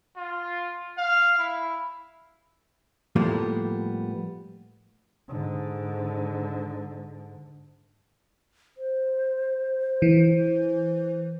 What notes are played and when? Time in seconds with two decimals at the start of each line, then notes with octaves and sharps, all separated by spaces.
0.16 F4
0.98 F5
1.39 E4
3.16 A2 F3 G3 A#3 B3
5.28 G#2 D3
8.78 C5
10.02 E3